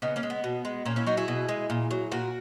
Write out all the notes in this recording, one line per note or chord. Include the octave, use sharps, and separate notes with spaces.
C#3 B3 D#4
A#3 C#4
G#3
B3
B2
G#3
A#2 A#3 C#4
C#4 E4
F#3 D#4 F#4
E4 G#4
B2
G#3
A#2
F#3
A#2 F#4 A#4